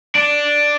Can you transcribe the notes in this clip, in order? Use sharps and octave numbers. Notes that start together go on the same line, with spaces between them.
D4